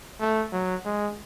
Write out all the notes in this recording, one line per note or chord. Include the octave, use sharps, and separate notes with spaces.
A3
F#3
G#3